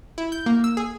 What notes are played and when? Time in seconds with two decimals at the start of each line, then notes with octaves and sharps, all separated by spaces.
0.18 E4
0.32 G6
0.46 A#3
0.64 E6
0.77 G#4